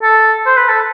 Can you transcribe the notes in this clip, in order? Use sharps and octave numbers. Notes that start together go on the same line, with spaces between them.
A4
C5
B4
A4